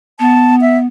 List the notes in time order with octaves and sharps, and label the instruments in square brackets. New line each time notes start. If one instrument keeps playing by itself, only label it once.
[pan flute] B3 [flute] A5
[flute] E5